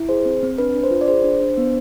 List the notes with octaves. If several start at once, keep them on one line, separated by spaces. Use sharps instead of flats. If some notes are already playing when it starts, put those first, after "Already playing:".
Already playing: E4
G#4 C5
C4
C4
D4 B4
D4
C5
F4
D5
G#4 C5
D4
D4
B3